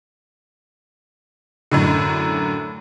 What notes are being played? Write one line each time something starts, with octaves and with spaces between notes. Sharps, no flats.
F#2 A2 D3